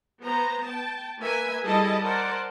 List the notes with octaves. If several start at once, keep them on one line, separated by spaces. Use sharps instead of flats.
B3 C5 A#5
G5 A5
A#3 B4 E5 G#5
G3 E4 G#4 A4 D#5 A5
A#4 C5 D5 F#5 A5